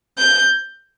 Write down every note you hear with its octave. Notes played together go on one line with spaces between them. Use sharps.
G6